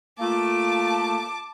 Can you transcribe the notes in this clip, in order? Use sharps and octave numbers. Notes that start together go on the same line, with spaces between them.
A3 A#3 F4 A5 D6